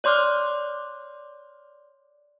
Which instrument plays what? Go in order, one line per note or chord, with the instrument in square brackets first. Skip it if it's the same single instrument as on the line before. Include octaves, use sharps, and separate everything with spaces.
[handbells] C#5 D5 C6 D6 F6 F#6